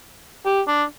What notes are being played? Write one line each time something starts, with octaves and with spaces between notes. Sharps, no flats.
G4
D4